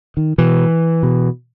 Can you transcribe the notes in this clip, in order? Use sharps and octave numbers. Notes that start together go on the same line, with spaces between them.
D#3
B2 E3
B2